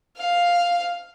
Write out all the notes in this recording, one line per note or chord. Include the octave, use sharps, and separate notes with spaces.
F5